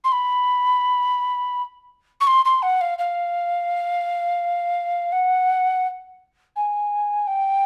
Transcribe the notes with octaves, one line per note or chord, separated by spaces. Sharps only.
C6
B5
C#6
C6
C6
F#5
F5
F5
F#5
G#5
G5